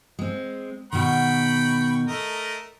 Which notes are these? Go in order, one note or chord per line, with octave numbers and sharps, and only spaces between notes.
G#3 C4
B2 D#3 G5 B5 C#6
A3 A#4 D#5